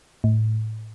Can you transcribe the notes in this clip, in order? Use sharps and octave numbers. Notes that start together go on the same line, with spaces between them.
A2